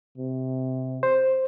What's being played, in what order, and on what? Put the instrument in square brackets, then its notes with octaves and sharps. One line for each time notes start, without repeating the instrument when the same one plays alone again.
[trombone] C3
[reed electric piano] C5